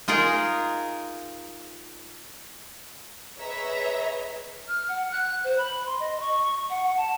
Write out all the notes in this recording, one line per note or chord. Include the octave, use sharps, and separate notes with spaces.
D#4 F4 G#4 A#4 D#5
G#4 B4 C#5 D#5 E5 A#5
F6
F#5
F#6
C5
B5
C6
D#5
C#6
F#5
F#5
A5